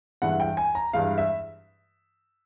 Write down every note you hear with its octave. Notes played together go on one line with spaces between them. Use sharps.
G2 E3 G#3 F#5
G5
G#5
A#5
G2 E3 G#3 F5
E5